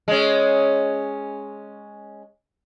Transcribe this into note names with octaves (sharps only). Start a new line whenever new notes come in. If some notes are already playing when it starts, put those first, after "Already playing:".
G#3 C#4